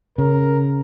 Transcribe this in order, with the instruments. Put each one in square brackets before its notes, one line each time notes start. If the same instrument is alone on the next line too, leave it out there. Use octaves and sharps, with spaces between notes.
[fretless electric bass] C#3 [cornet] A#4